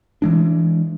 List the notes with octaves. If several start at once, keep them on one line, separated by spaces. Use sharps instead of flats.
E3 G#3 D4